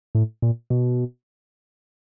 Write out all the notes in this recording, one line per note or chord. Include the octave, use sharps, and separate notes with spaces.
A2
A#2
B2